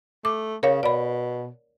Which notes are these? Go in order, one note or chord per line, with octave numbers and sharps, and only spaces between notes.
A3 D6
C#3 A#4 C#5 F5
B2 D5 B5